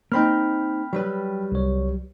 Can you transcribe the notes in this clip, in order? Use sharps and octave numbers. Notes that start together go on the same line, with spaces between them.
A#3 C4 D#4 G5 B5 F6
F#3 G3 B4
C2 C#5